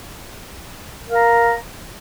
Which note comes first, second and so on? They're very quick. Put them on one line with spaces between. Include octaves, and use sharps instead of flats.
A#4 F5 A#5